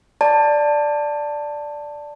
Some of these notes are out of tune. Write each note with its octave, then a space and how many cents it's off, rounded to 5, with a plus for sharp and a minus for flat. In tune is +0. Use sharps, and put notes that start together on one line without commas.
D5 +0 A5 +10